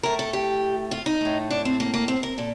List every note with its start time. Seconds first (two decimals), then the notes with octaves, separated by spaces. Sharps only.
0.03 A2 A3 A#4
0.19 A4
0.33 G4
0.91 F4
1.06 D#4
1.21 A2 A3
1.50 D4
1.65 C4
1.80 A#3
1.94 A#3
2.08 C4
2.23 A#4
2.38 A#2 A4